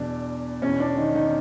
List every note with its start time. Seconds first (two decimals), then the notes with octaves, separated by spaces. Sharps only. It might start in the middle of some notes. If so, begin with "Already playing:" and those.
Already playing: E2 B2 D4
0.62 E2 B2 C#4
0.80 D4
0.97 D#3 D#4
1.15 D#3 D#4